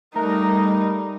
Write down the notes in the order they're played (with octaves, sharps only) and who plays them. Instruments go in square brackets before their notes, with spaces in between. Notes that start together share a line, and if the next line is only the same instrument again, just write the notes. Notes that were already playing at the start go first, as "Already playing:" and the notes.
[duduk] G3 [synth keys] A3 A#4 [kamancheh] D#4 [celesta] A#5 F#6